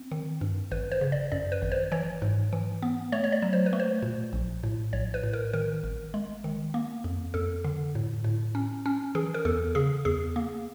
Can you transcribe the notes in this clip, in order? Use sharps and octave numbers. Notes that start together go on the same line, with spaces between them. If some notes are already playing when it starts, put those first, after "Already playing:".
Already playing: C4
D#3
G2
G#1 B4
C5
C#3
D5
F#2 D5
B4
G#1
C5
E3 C#5
G#2
E3
B3
A3 C#5
C#5
D5
F#3
C5
B4
A3
C5
A#2
A#1
A2
A#1 C#5
B4
A2
A#4
D#3 A#4
G#1
G#3
D#3
A#3
F2
F2 A4
D3
A2
A2
C#4
C#4
E3 G#4
A#4
E2 A4
C#3 G#4
E2 G#4
A#3